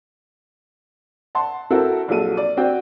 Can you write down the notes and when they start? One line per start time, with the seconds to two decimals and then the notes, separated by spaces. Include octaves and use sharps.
1.35 F#5 A5 C6
1.70 C4 E4 F#4 A4 A#4
2.08 A#1 F#3 A4 D#7
2.37 D5
2.57 C4 F#4 D5 G5